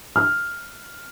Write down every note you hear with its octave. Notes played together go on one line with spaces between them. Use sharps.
F6